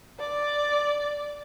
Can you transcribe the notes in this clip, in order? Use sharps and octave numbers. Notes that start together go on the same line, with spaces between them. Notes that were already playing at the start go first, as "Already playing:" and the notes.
D5